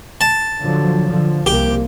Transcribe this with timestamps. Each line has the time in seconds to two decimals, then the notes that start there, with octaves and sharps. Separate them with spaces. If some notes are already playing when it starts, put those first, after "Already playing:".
0.21 A5
0.60 D3 F3 F#3
1.07 D3 F3
1.46 C2 C3 A#3 G4